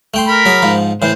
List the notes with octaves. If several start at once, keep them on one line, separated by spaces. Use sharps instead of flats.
A3 G5 C6
A#4 B5
F#3 G#4
G#2 F3
A2 E3 C5